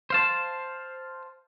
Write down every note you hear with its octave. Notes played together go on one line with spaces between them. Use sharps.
C5 F5 A5